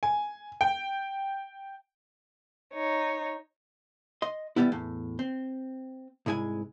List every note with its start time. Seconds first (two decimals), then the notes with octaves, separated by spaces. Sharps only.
0.03 G#5
0.61 G5
2.74 D#4 C#5
4.22 D#5 C6
4.56 E3 F3 G3 B3 E4
4.72 E2 A2
5.19 C4
6.26 C2 G#2 G#3 E4 G#5